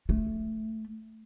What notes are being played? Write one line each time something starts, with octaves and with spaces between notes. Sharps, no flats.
A3